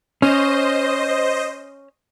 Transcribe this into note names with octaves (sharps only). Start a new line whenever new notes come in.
C#4 C5 D#5